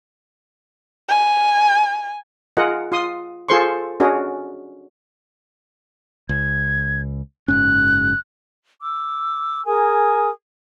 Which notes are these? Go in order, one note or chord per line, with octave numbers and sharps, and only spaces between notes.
G#5
F4 G#4 A#4 D#5 F#5
F4 C6 D#6
F4 G#4 A4 C5 C6 C#6
C#4 D4 F#4 G#4 A#4 D#5
C#2 G#6
F#1 G#2 C#4 F#6
D6 E6
G#4 A#4 G#5 D#6